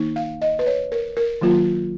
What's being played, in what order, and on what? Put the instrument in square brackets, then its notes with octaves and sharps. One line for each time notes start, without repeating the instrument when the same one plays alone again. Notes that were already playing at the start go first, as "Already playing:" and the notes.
Already playing: [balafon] D#3 A#3 D#4
F5
D#5
B4
C#5
A#4
A#4
D#3 F#3 A#3 F4